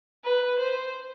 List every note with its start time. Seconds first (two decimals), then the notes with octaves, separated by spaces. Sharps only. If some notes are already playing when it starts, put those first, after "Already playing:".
0.25 B4
0.59 C5